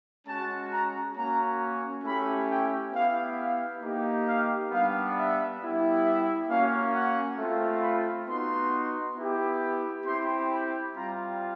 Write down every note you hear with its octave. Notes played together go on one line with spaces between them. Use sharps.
G#3 C#4 F#4 A5
A#5
A#3 C#4 F#4 A#5
A3 C#4 E4 G4 B5
G5
B3 E4 G4 F5
F5
A#3 D#4 G4
F5
G3 B3 D4 F5
E5
G3 B3 E4 G4
E5
A#3 C#4 F#4 F5
F#5
A3 C4 F4
B5
B3 D#4 F#4 C6
B3 E4 G4
C4 E4 G4 C6
B5
G3 C4 F4 A#5